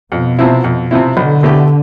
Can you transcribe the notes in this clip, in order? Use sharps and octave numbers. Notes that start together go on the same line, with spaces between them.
F2 B2
C3 F3 C4 E4
F2
C3 F3 C4 E4
B1 D3
B2 A3 E4 G4